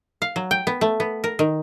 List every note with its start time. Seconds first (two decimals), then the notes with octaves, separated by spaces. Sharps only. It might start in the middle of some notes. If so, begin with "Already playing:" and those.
0.22 F5
0.36 F#3
0.51 G5
0.67 B3
0.81 A3
1.00 B3
1.24 A#4
1.39 D#3